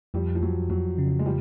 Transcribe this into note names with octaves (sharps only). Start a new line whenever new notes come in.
F2 F3 G3
F3
F2 F#3
F2 F#3
C#3
G#3
F3 G3